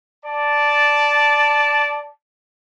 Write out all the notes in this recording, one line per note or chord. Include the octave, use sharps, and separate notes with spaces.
D5 A5